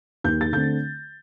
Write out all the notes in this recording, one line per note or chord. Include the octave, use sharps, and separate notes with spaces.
D#2 G6
A6
D3 A3 C4 G6